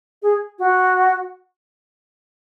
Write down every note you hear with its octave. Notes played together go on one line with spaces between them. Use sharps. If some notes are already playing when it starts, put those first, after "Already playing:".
G#4
F#4